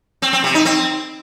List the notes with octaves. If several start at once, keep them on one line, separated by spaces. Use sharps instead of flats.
C4
C4
C3
D#4
C4